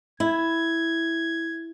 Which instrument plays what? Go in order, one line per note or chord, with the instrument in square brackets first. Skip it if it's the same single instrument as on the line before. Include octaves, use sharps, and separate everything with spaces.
[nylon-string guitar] E4 [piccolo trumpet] G#6